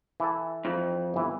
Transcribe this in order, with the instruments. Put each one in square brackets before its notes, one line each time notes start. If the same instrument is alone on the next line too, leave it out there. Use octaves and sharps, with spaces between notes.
[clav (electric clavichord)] E3 A4
[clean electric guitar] F2
[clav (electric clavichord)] G1 E3